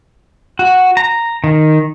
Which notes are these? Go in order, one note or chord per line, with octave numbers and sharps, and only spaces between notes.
F#4
A#5
D#3